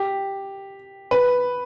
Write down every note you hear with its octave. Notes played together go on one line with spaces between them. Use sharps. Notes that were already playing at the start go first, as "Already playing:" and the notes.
Already playing: G4
B4